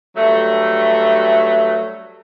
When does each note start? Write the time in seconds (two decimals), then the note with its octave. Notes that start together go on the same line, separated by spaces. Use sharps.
0.16 G2 F#3 A3